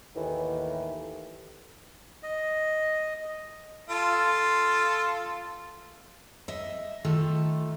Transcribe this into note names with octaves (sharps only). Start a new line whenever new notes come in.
D#2 A2 D#3 E3
D#5
F4 A4
D#5 E5
D#3 A3 F4 A4